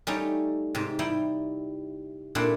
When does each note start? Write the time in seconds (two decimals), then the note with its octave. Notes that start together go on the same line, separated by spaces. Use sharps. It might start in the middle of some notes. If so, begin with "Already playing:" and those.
0.07 G3 A3 C#4 D#4 G4 A4
0.75 G#2 C3 G4
0.99 G3 D#4 E4 G5
2.35 A#2 G3 A3 C4 D4 E4